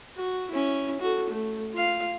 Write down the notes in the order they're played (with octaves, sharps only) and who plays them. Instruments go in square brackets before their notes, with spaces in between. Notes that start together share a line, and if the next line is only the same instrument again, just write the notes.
[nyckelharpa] F#4
C#4 E4
F#4 A4
A3
F4 F5